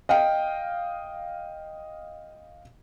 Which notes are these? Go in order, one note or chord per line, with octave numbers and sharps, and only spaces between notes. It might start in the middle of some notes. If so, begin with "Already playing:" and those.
D#5 F5 G5